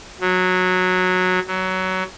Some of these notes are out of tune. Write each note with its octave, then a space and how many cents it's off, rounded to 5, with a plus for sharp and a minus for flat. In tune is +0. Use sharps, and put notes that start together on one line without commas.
F#3 -15
F#3 +15